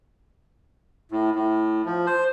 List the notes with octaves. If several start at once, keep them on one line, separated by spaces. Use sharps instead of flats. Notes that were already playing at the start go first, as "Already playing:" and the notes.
A2
A2
F3
C5